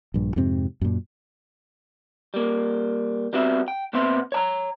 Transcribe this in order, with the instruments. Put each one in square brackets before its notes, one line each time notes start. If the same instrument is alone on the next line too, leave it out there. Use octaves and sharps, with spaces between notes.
[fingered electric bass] A#1 G2
F2 G#2 C3 C4
F#2 A#2
[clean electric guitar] G3 A#3
G3 B3 C4 F#4 E5
G5
A#2 B3 C4 E5 C6
C#5 A5 A#5